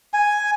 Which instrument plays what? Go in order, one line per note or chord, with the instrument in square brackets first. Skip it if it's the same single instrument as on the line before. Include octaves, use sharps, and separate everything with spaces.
[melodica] G#5